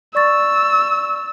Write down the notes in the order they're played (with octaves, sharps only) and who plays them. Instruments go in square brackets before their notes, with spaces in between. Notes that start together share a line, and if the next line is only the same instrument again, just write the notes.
[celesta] D5 C#6 A6 [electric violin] E6